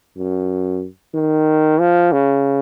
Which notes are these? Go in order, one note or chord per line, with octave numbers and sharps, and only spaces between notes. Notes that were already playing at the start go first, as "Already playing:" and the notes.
F#2
D#3
F3
C#3